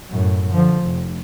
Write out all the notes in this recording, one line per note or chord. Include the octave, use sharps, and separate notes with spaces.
F#2 A2
D3 F3
F1